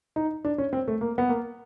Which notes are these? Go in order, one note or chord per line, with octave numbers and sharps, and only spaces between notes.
D#4
D4
C#4
C4
A3
A#3
B3
A#3